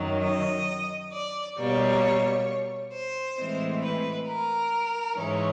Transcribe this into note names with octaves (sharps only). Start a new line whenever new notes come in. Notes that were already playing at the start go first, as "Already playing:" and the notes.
Already playing: F#2 D#3 F#3
D#5
D5
B2 G3 A#3 C#5
C5
A2 E3 G#3 C4
B4
A#4
G#2 E3 G#3 C#4